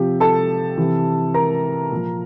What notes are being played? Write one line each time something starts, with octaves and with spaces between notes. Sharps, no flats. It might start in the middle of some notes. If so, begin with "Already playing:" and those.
Already playing: C3 F3 G4
A4 A5
C3 E3
A#4 A#5
A#2 F3